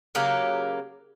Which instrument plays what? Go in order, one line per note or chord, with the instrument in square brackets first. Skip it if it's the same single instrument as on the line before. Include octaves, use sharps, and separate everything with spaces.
[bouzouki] C#3 F#3 A#3 G4